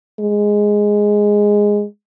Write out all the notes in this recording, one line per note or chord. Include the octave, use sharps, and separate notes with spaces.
G#3